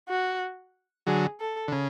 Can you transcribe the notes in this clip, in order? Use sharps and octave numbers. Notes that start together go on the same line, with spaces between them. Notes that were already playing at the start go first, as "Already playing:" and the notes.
F#4
D3 F#3 G#4
A4
D3
C#3